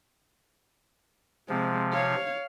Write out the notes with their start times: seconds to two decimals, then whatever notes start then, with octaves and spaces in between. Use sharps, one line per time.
1.49 C3 F3 G#3 C4
1.93 C#5 F5